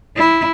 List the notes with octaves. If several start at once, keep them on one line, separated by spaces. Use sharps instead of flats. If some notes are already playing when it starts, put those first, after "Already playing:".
E4